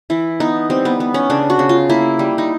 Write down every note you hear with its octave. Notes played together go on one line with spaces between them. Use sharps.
E3 E4
B3 D#4
G3 C4
B3
B3
C#4
C#3 D4
F#4
C#3
F4
A#3 E4
G3
D#4